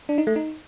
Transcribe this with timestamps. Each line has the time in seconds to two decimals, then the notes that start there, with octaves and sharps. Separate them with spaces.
0.09 D4
0.18 D#4
0.27 A3
0.36 D#4